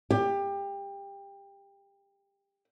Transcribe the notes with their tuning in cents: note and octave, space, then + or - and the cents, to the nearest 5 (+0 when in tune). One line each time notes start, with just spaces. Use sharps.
G4 +20